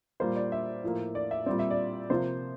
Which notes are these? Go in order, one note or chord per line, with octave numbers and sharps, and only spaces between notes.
A#2 G3 A#3 C5
D5
E5
A2 F3 A#3
D5
E5
A#2 G3 C4 D5
E5
D5
C3 F3 A#3 C5